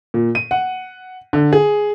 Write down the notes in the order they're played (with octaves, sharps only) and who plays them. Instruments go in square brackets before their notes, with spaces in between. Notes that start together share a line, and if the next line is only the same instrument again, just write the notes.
[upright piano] A#2
D#7
F#5
D3
G#4